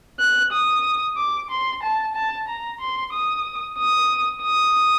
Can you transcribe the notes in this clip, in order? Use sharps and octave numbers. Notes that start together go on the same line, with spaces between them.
F#6
D#6
D6
C6
A5
A5
A#5
C6
D#6
D#6
D#6